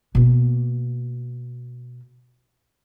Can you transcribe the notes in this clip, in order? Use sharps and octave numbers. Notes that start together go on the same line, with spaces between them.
B2 A#3